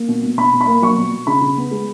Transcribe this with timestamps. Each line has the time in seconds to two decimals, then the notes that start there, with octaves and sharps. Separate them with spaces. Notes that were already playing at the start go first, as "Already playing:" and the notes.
Already playing: A#3
0.08 B2
0.23 B2
0.38 B2 B5
0.53 B2
0.61 B5
0.67 A#3
0.82 F#3 C#6
0.97 B2
1.12 B2
1.27 C#3 B5
1.41 C#3
1.57 B3
1.71 G#3